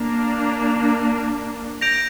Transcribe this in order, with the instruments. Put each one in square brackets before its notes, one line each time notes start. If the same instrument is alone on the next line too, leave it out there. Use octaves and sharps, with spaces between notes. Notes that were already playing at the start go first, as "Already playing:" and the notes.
Already playing: [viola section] A#3 D4
[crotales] G6 A#6 D7 F7